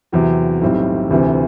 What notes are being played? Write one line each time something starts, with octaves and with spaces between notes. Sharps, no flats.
E2 C3 F#3 C4 G4
B1 A2 G3 C4
D2 C3 E3